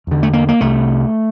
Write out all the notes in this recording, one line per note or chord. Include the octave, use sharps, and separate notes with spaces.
E2 D3
A3
A#3
A#3
C2 C3 A3